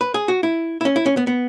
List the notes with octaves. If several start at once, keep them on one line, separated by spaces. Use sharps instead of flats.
B4
G#4
F#4
E4
E4
C#4
E4
C#4
B3
B3